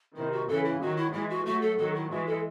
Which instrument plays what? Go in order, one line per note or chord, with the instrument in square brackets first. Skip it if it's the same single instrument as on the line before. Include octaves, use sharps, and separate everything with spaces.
[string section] C3 D#3 [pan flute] E4
[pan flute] F#4
[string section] C#3 E3 [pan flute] A4
[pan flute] E4
[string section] D#3 F#3 [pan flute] F#4
[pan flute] E4
[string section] E3 G#3 [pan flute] E4
[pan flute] F#4
[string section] F#3 A3 [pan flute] F#4
[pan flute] A4
[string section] D#3 F#3 [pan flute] A4
[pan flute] E4
[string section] E3 G#3 [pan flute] F#4
[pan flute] A4